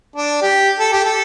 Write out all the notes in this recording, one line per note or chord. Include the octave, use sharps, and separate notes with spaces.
D4
G4
A4
G4
A4